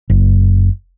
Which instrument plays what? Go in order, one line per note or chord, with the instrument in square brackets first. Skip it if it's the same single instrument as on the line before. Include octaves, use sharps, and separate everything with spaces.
[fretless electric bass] F#1